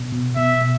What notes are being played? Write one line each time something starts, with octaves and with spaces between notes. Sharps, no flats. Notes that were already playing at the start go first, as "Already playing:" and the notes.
Already playing: B2
B2
B2 E5
B2